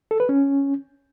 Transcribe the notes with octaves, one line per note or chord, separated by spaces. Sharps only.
A4
B4
C#4